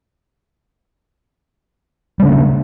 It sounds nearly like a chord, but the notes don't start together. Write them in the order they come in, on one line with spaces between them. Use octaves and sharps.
G3 C#3 D4 A#3